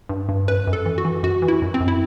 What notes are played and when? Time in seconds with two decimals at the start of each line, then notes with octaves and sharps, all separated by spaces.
0.09 G2
0.29 G2
0.48 F#2 B4
0.67 F#2
0.73 A4
0.86 E3
0.98 F#4
1.05 E3
1.23 F#2 F#4
1.42 E3
1.48 E4
1.62 F#2
1.74 C4
1.80 F#2
1.88 E4